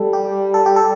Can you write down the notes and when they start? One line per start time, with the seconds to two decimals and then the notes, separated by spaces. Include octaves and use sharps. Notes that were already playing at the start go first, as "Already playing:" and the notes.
Already playing: G3 A4
0.13 G4
0.54 A4
0.66 G4
0.76 A4